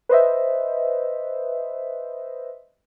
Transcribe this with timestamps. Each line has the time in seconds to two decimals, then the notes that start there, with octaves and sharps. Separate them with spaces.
0.09 B4 C5 D#5 E5